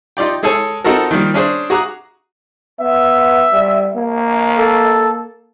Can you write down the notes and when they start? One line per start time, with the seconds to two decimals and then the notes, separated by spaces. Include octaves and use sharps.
0.17 D#4 F4 G4 D5 G5
0.43 G#3 G#4 A4 C#5 G#5 E6
0.84 C4 D#4 F4 F#4 A4 A#4
1.11 D#3 F3 G3 A#3
1.34 C#4 D4 G#4 C5
1.70 F#4 G#4 A#5 D6 F#6
2.80 B3 E5
3.52 G3
3.96 A#3
4.58 A4